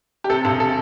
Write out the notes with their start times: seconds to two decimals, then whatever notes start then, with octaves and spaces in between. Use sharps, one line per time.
0.24 G4
0.29 C3 A4
0.45 E1 A4
0.60 A4